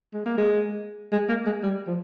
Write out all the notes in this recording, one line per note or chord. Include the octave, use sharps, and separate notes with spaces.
G#3
A#3
G#3
G#3
A#3
G#3
G3
F3